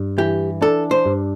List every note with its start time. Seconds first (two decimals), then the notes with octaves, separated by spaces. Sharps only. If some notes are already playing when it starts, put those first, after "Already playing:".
Already playing: G2
0.18 E3 G4
0.62 D4 A4
0.91 C5
1.06 G2